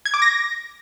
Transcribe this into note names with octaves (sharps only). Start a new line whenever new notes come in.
G#6
D6
A#6